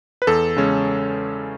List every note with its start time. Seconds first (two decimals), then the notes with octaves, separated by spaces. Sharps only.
0.22 B4
0.27 E2 A4
0.56 C#3 G#3 C#4